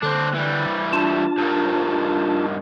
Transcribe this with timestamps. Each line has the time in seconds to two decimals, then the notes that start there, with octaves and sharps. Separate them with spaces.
0.03 D3 C4 D4 F#6
0.34 E3 G3
0.93 D4 F4 A5
1.38 G2 D#3